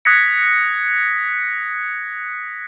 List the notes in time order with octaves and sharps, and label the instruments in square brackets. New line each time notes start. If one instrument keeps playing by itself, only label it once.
[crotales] D#6 F#6 G#6 A#6 B6 C#7